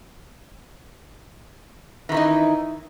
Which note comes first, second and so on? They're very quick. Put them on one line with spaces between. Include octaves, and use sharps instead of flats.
E3 D#3 E4 D#4